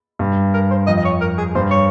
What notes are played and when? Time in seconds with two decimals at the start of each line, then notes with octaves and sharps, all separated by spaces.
0.19 G2
0.54 A#4
0.71 C5
0.87 F2 D#5
0.97 D#5
1.05 C#5
1.21 A#4
1.38 G#4
1.55 G2 C5
1.71 C#5